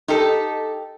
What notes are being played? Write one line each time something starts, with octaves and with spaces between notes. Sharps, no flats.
D#4 G4 A4